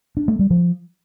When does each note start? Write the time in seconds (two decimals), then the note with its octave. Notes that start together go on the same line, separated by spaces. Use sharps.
0.17 D4
0.28 A3
0.39 G3
0.50 F3